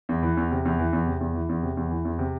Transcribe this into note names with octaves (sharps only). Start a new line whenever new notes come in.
E2
E3
E2
C3
E2
E3
E2
C3
E2
E3
E2
C3
E2
E3
E2
C3